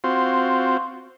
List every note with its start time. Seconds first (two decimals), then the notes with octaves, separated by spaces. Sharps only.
0.04 C4 F4 F#4 C5